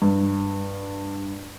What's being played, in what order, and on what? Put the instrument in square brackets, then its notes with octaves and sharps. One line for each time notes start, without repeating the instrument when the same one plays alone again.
[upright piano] G2